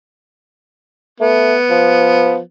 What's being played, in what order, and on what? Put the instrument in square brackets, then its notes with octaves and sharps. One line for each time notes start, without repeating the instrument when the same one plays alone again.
[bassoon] A3 [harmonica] B3
[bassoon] F3